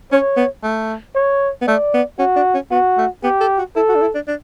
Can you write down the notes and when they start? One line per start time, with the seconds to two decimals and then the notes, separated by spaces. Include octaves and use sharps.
0.12 C#4 C#5
0.37 B3
0.63 A3
1.15 C#5
1.61 B3
1.67 A3 D5
1.94 B3
2.19 C#4 F#4
2.36 D4
2.54 C#4
2.71 B3 F#4
2.97 A3
3.23 B3 G4
3.41 A4
3.58 F#4
3.76 E4 A4
3.88 F#4
3.95 D4
4.01 E4
4.15 D4
4.27 D4